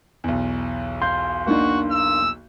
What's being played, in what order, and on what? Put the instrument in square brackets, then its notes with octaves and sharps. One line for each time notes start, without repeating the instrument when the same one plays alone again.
[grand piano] B1 E2
[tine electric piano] F5 C6 [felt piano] G6
[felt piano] A#3 D4 D#4 [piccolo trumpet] F#4
[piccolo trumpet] E6